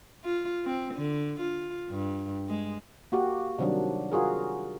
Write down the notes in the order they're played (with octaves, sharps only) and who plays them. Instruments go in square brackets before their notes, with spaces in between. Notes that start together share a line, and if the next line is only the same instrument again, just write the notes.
[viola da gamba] F4
C4
D3
F4
G2
G#3
[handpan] A#3 F#4 G4
C3 D#3 F#3 G3 D4
F4 F#4 G#4 A#4